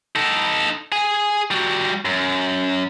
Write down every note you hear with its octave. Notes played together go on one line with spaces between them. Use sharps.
D#4 A4
G#4 G#5
G3 F#4
F#2